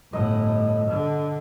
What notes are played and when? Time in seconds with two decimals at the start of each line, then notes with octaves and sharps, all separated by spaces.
0.13 G1 A2 D#5 F#5
0.92 D3